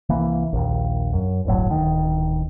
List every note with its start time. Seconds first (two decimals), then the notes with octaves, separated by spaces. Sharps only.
0.09 C2 E3 A#3
0.53 A#1 D#2
1.13 F#2
1.45 D1 G1 A2 F#3
1.71 D1 D#3